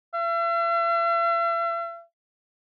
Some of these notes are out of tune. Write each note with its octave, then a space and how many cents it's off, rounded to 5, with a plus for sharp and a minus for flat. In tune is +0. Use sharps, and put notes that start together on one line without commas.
E5 +45